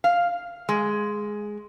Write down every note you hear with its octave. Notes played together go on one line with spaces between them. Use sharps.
F5
G#3